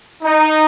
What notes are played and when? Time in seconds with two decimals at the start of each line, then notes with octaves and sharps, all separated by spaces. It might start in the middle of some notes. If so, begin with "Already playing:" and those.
0.23 D#4